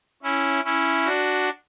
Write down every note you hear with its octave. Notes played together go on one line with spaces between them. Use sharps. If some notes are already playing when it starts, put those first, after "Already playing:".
C#4 E4
C#4 E4
D4 F#4